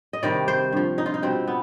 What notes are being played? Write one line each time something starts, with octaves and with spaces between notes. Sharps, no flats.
D#5
C3 D#3 G3 D5
C5
G2 F3
D#4
F4
D#4
B2 G3 C4
B3